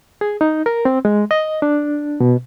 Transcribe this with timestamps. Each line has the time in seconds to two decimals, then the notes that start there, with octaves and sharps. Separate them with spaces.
0.21 G#4
0.41 D#4
0.66 A#4
0.85 C4
1.05 G#3
1.31 D#5
1.62 D4
2.20 B2